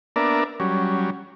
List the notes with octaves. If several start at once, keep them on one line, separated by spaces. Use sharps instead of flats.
A#3 B3 D4 A#4 D5 E5
F#3 G3 C#4